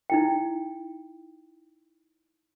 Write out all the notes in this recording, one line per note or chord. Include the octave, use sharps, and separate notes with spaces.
D#4 E4 G5